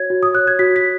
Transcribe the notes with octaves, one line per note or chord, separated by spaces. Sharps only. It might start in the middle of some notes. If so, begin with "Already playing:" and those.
Already playing: F#4 C#5 G#6
F#4
D#6
C#5 F#6
G#6
F#4 B6
B6